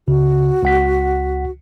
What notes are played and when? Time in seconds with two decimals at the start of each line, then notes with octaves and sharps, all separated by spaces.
0.08 C#2 C#3 F#4
0.63 C#2 F#5 B6